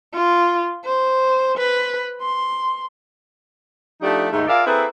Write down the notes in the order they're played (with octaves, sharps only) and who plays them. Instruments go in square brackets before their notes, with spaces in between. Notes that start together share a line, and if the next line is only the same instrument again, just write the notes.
[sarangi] F4
C5
B4
C6
[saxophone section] F3 A3 D4 D#4 G4
D#2 G#2 G#3 A3 D#4
F4 G#4 A#4 D5 E5 F5
A#3 C4 E4 G#4 A4 B4